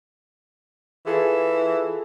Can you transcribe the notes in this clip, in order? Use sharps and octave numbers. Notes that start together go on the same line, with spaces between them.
E3 F4 G#4 A4